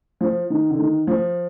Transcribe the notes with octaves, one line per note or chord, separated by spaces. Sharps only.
F3
D#3
D3
D#3
F3